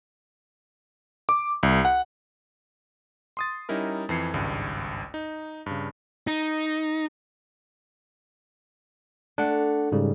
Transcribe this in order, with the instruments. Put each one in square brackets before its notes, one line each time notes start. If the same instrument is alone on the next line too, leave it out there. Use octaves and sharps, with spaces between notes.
[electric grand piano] D6
C2
F#5
C6 D#6 A6
G3 C#4 D#4 E4 A#4
F2 E3 C7 C#7
G#1 C#2 G2
D#4
G2 C#3
[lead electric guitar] D#4
[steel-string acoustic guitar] A3 [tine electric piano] D4 F#5
[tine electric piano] G#2 C#3 G3